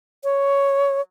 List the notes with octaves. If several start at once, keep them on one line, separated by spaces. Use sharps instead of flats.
C#5